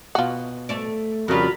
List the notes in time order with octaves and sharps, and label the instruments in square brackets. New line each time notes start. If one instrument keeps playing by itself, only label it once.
[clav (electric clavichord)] B2 F#5 [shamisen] F4 F#4
[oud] A3 D5
[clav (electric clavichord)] F2 C#3 G3 [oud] F4 F#4 [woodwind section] A#4 A#5 B5